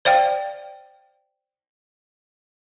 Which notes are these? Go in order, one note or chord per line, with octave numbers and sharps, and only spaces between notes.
C5 D5 F5 G5